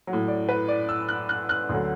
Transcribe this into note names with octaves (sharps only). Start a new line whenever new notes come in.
F#3
A2
D5
B4
D5
E6
F#6
F#6
F#6
D2 D3 F#3